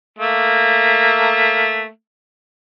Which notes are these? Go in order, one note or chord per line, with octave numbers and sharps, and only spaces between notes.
A3 A#3